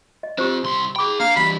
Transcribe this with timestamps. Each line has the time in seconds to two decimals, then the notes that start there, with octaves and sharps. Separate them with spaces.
0.23 D#5
0.38 C4 F4 G4 C5
0.64 C2 C6
0.96 G#4 G5 B5 D6
1.20 A#3 D4 F5 A#5
1.36 E3 G3 B5